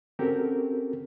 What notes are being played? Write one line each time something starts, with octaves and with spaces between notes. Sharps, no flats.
C4 C#4 F#4 G4 A4 A#4